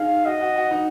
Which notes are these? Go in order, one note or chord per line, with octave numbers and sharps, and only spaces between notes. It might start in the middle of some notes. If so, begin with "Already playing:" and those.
Already playing: D#4 G#4 F5
F#4 D#5
F#4
F#4
D#4